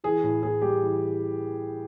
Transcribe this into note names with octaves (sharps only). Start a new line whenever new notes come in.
E3 G#4
A2
A2 G#4
G3 G4
E3